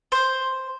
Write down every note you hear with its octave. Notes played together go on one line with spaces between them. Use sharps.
C5